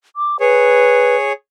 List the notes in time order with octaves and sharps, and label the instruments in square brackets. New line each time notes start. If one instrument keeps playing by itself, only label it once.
[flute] D6
[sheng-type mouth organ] G#4 C#5 [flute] B4